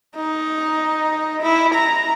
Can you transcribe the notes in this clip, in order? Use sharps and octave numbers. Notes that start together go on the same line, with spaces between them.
D#4
E4
A#5